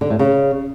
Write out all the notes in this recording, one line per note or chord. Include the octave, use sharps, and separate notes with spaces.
D3
A2
C#3